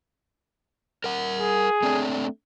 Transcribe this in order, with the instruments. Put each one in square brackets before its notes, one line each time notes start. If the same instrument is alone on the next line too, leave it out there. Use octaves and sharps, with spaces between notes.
[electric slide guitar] A#4 F#5
[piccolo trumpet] G#4
[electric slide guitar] A3 C4 D4